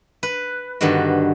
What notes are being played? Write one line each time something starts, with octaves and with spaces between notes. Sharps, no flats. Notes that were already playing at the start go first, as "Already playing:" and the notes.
B4
G2 D3 D#3 B3 F#4